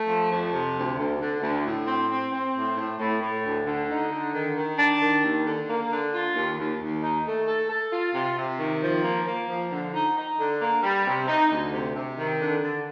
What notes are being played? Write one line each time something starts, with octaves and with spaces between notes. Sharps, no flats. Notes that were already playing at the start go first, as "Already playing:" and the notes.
Already playing: A3
F3
F2
C3
D2
D2
D3
D2
A2
C4
C4
C4
A2
A2
A2
A2
D2
D3
D#4
D3
D#3
D#3
D4
D#3
D#2
D3
A#3
D3
F4
D#2
D#2
D#2
D#4
A3
A4
A4
F4
C3
C3
D#3
F3
A#3
A#3
F3
D3
D#4
D#4
D3
A#3
G3
C3
D#4
D2
C3
C3
D#3
D3
D3